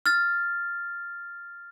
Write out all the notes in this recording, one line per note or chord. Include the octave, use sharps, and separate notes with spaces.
F6 A6